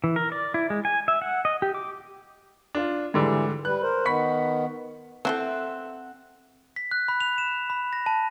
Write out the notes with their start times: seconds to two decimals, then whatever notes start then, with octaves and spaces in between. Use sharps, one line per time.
0.04 E3
0.16 A#4
0.32 D5
0.54 E4
0.70 G#3
0.85 G#5
1.08 E5
1.22 F#5
1.45 D#5
1.62 G4
1.74 D6
2.75 D4 F4
3.14 G#2 D3 E3 G3 G4
3.65 G3 B4 F#6
3.83 A#4 C5
4.05 D#3 B3 B5 C#6 B6
5.25 E3 F#3 A3 C4 A4 E5 F#5
6.76 B6
6.91 F#6
7.08 B5
7.20 F7
7.38 E7
7.70 B5
7.93 A#6
8.06 A5